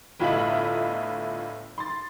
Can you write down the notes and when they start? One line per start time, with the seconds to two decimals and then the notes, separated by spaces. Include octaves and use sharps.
0.20 G1 A2 F4 D#5 E5 F#7
1.78 C6 A6